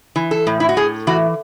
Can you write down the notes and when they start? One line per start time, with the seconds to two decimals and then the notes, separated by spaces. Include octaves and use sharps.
0.16 E3
0.31 A4
0.47 A2
0.60 E4
0.69 F#4
0.77 A2 G#4
1.07 E3 F#4